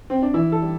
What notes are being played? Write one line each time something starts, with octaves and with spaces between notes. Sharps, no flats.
C4
D4
E3 E4
A4
G3